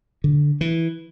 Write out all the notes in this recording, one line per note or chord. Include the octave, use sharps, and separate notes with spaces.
D3
E3